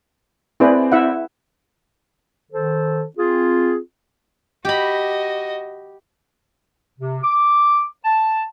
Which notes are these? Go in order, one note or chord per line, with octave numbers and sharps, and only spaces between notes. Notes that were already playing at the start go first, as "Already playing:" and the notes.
C4 E4 G#4 B4 D5
E4 E5 F#5
D#3 A4 C5
C4 F4 G#4
F#4 G4 D#5 B5
C3
D6
A5